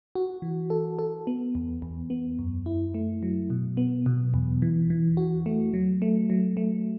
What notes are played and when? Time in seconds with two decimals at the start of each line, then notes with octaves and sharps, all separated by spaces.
0.15 F#4
0.42 E3
0.70 A4
0.99 A4
1.27 B3
1.55 E2
1.82 E2
2.10 B3
2.39 F#2
2.66 E4
2.94 A3
3.23 F#3
3.50 B2
3.77 B3
4.06 B2
4.34 E2
4.62 E3
4.90 E3
5.17 F#4
5.46 A3
5.74 F#3
6.02 A3
6.30 F#3
6.57 A3